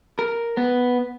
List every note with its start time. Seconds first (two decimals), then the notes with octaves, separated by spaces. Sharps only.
0.19 A#4
0.57 B3